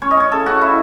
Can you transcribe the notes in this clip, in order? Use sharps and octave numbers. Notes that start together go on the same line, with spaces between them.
C#4 C#5
D#5
C#4 C#5
C#3 A4
C#3 F#4
C#3 E4